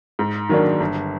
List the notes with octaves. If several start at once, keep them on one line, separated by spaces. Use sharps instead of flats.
G#2
D#3 F#3 A#3 D4
G1